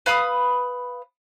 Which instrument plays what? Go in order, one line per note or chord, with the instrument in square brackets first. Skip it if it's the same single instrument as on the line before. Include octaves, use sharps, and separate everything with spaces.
[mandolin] B4 F5 B5 D#6